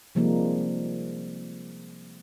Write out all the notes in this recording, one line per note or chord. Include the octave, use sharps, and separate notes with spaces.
C3 F3 G3 G#3 A#3 D#4